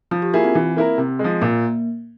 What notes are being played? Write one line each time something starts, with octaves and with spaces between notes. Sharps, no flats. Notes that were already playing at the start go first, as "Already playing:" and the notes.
F3 F4
G4
A#3 E4 F4 G#4
C4
E3 C4
A#3 E4 A#4
C3
G#3
F3
A#2 A#3